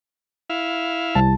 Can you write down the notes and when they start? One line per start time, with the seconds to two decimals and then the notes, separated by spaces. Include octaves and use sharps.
0.50 E4 F5
1.15 C2 A5